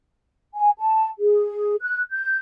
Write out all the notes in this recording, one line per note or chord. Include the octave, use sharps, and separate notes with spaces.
G#5
A5
G#4
F#6
G6